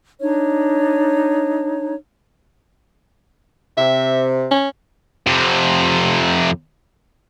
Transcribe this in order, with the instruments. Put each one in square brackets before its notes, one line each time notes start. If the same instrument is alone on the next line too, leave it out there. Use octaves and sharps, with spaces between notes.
[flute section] D4 D#4 C#5
[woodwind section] C3 [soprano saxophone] E5
[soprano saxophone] C#4
[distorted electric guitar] F2 C3